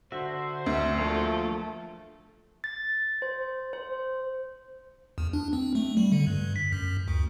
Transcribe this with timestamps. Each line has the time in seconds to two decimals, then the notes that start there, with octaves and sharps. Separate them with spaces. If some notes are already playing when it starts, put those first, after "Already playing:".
0.12 D3 F#4 C5 E5
0.66 D2 E5
0.98 F3 A3 A#3
2.64 A6
3.22 C5
3.73 C5
5.18 E2
5.33 D4
5.53 C4
5.75 A3
5.97 G3
6.12 D3
6.27 G2
6.56 B6
6.72 F#2
7.08 D2